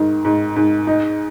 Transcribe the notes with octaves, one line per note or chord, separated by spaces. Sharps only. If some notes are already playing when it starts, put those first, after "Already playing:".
Already playing: G#2 D#3
G#2
G#2
D#4